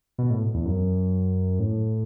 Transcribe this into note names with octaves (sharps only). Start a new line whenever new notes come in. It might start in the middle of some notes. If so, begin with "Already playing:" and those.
B2
A2
E2
F#2
A2